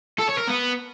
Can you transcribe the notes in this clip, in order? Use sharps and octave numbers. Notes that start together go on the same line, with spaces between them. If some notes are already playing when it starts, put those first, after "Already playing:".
A4
C#5
A#4
B3